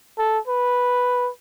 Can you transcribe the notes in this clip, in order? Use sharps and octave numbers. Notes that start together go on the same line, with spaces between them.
A4
B4